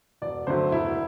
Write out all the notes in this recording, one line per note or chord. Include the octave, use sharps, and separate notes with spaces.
E1 D5
D2 D3 F#3 A3 C5
E1 E4